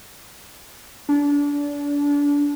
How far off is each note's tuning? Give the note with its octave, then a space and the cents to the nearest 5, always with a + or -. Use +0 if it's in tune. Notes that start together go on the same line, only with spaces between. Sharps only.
D4 -30